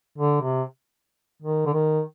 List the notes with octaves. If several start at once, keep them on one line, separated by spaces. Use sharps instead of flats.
D3
C3
D#3
D3
D#3